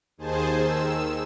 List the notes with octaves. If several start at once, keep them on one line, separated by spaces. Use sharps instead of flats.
D#2 D#3 G#4 C5 G#5 A5
D#3 E6 E7